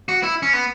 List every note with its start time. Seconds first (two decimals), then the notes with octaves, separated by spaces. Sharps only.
0.09 F#4
0.23 E4
0.43 C#4
0.53 B3